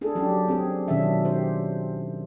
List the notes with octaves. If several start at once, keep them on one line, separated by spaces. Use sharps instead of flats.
D4 G#4 A4
F#3 C#4 D4 G4
C4 G#4
B2 D#3 F#3 C#4 D4 E5
G4 C5